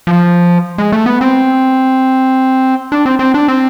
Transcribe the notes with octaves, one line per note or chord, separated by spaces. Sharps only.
F3
G#3
A3
B3
C4
D4
C4
C4
D4
C4